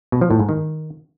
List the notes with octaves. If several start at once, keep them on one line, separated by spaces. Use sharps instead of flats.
B2
F3
A2
G#2
D#3